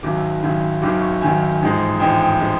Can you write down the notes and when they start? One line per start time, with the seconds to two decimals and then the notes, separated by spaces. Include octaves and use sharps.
0.03 G#1 F#2 D#3 F#3 D6
0.42 G#1 F#2 D#3 F#3
0.82 G#1 F#2 D#3 F#3 D6
1.01 C#6
1.21 G#1 F#2 D#3 F#3 G#5
1.61 A1 G#2 F3 G#3
2.00 A1 G#2 F3 G#3 G5
2.21 G5
2.40 F3 G#3